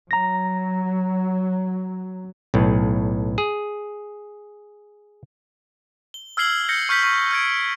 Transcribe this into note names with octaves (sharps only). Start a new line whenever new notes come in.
F#3 A#5 A#6
B1 A2
G#4
G7
E6 F6 G#6 C7 F#7 G7
E6 G6 A#6 C#7
C#6 F6 G6 B6 F#7
C#6 F6 B6
F6 G6 G#6 D7